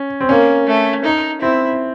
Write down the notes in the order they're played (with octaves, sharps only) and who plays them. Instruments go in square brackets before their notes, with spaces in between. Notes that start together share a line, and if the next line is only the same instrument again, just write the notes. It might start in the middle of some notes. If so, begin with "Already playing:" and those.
Already playing: [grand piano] C#4
C4
[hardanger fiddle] A#3 [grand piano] C#4
[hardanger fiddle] A3
D#4
[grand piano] C4 [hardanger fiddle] E4